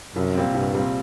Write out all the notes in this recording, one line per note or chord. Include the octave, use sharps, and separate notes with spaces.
C2 F#2
A#2 G3 C4
C2 G2
A#2 G3 C4